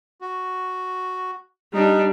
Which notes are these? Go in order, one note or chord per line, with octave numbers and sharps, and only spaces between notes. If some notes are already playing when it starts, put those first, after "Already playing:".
F#4
G3 D4 D#4